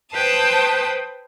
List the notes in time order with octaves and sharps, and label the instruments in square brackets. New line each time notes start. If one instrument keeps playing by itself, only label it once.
[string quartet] B4 C5 G5 A5 D#6